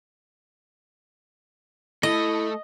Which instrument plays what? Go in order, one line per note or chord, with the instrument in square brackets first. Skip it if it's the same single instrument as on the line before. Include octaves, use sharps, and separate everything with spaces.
[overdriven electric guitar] A3 [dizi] E4 [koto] D#5